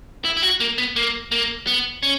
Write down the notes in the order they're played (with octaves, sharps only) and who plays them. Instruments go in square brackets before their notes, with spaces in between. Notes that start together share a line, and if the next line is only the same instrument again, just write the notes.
[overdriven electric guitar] E4
E4
F#4
A#3
B3
A#3
A#3
B3
C#4